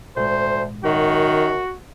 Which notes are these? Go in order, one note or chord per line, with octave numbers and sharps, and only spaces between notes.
G#1 D2 A#2 G#3 C5
F#2 D#3 F#4